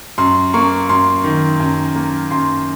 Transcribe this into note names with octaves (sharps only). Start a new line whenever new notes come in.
F#2 C6
A#3 C#6
F#2 C6
D#3
F#2
A#3
F#2 C6